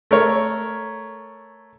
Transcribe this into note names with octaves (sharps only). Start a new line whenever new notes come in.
A3 A#4 C#5